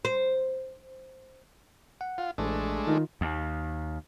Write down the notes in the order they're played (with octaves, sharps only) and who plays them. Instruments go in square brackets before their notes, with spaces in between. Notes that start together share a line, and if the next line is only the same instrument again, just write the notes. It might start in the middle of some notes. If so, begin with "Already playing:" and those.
[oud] C5
[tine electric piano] F#5
[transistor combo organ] F4
[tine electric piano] A1 [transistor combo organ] G#3 A3 D4
[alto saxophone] D#3 [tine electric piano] F4
[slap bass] D#2